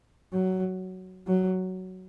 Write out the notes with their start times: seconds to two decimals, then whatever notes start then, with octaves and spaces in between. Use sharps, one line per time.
0.33 F#3
1.27 F#3